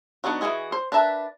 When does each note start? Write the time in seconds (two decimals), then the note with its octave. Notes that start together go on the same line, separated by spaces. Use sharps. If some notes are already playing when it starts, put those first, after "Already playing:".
0.24 F#3 B3 D4 D#4 F#4
0.41 E3 F3 F#4 G#4 D#5
0.72 C5
0.92 D4 A#4 B4 E5 A5